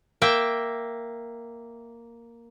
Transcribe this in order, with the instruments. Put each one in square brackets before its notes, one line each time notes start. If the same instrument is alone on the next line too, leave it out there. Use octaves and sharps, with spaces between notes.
[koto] A#3 E5 G5